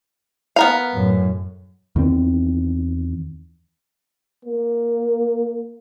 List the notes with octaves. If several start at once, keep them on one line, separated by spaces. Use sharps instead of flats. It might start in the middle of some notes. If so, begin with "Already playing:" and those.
B3 A#4 F5
F#2 A2
E2 D#3 C4
A#3